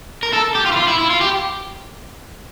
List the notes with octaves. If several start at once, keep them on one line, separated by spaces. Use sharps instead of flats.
A#4
A4
G4
F4
E4
F4
E4
E4
F4
G4